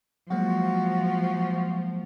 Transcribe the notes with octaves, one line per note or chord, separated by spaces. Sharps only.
F3 F#3 G#3 A#3 F#4